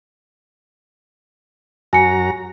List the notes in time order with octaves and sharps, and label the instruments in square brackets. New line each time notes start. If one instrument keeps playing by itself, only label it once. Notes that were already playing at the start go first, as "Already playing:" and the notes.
[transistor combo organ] F#2 F#4 A#5 [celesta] G#5 C#7